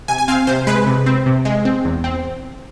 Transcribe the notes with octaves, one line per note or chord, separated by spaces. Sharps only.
C3 G#5
G#5
C4 F5
C3 C5
G#3 B4
C3
C4
C3
G#3
C4
E2
C4